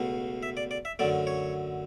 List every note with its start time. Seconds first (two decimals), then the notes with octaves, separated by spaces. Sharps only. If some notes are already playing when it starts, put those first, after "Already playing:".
Already playing: C#2 B2 A3
0.43 E5
0.57 D5
0.71 D5
0.85 E5
0.99 F#2 D3 F#3 A3 D5
1.27 C#5